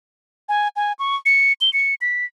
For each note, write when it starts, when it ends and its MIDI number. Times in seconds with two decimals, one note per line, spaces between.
0.49 0.68 80
0.76 0.93 80
0.99 1.16 85
1.26 1.53 97
1.61 1.72 103
1.73 1.95 97
2.01 2.25 95